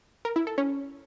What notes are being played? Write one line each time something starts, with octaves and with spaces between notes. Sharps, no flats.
A#4
E4
A4
C#4